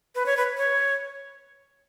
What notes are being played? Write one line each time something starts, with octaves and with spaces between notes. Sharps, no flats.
B4
C#5
B4
C#5